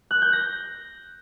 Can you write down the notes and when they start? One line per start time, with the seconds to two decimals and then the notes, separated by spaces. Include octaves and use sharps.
0.11 F#6
0.22 G6
0.33 A#6